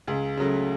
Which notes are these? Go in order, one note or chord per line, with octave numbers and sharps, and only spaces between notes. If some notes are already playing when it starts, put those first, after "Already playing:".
C#2 G#4
C#3 F#3 A3